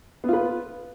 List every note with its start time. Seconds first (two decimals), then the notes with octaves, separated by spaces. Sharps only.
0.24 B3
0.28 F4
0.33 B4